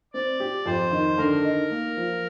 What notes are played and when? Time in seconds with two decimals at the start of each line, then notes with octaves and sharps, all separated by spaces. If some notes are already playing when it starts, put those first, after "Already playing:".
0.13 C4 D5
0.40 G4
0.66 F2 C5
0.91 D#3
1.18 D3 A#4
1.44 D#4
1.71 A#3
1.97 F3